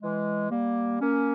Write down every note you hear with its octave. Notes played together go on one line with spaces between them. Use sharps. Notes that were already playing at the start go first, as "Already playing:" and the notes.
E3 G#3
G3 A#3
A#3 C#4